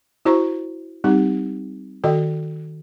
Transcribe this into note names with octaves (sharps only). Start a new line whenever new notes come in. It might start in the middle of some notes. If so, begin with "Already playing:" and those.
E4 F#4 C5 A#5 C#6
G3 C4 D#4 G4
D#3 F#4 A4 D#5 G5